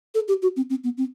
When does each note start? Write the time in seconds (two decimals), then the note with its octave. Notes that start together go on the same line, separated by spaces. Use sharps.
0.15 A4
0.28 G4
0.42 F#4
0.56 C4
0.70 C4
0.84 B3
0.98 C4